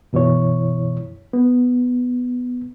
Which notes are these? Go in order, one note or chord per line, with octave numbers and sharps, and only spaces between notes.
F#2 B2 E3 E4 C#5
B3